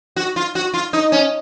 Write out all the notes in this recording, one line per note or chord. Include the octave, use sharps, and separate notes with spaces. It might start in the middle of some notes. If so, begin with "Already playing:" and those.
F#4
F4
F#4
F4
D#4
C#4